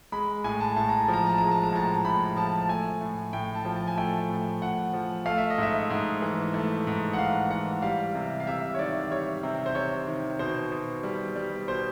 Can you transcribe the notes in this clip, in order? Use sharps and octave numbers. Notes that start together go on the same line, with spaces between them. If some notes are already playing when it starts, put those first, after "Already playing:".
G#3 B5
A2 G#5
A5
A2 A5
A#5
A5
F3
A#5
A5
G#3 A#5
A5
A#5
A2 A5
A2 B5
F3 A5
A5
A3 G#5
A2
A2 G5
A5
F3
A5
G#5
A3 G5
A2
A2 F#5
F3
A3 F5
E5
D#5
G#2 E5
G#2
E3
A3
G#2
F#5
G#2 F5
E3 F#5
G3 F5
C3
F5
C3 E5
C#5
D#3 D5
G3 C#5
C3
C5
C3 C#5
D#3
B2 C5
B2
G3
G3
B2 C5